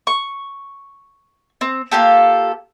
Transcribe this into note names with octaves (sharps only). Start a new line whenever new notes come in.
C#6
C4
A#3 F4 G4 A4